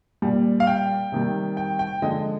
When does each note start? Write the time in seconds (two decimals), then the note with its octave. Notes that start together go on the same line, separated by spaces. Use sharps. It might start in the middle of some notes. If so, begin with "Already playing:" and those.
0.22 A#2 G3
0.60 F5
0.67 G5
1.12 C3 D#3 G3
1.57 G5
1.79 G5
2.02 D3 F3 G#3 D#5